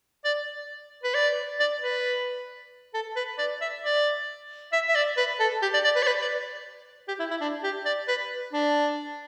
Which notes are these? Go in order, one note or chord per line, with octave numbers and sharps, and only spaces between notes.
D5
B4
D5
D5
B4
A4
B4
D5
E5
D5
E5
E5
D5
B4
A4
G4
D5
D5
B4
D5
B4
D5
G4
E4
E4
D4
G4
D5
B4
D4